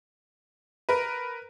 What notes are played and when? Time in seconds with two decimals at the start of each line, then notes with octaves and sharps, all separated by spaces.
0.89 A#4 B4